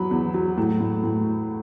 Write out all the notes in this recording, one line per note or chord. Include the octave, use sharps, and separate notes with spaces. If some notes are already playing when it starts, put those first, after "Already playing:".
Already playing: E2 F#3 B5
E2
F#3
A2
A2
A2